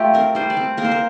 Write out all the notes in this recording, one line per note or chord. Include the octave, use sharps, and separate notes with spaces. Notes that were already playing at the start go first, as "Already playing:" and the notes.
Already playing: A3 F4 G4
C4 A#4
G3 C5
D5
C4
A#3 A#4
C5
A#4